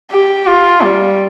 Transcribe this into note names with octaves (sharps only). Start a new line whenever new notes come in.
G4
F4
G3